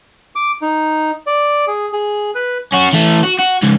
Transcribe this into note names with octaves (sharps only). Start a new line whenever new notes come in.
D6
D#4
D5
G#4
G#4
B4
C#4 F#4
E3 A3
F#4
F#4
C#2 G#2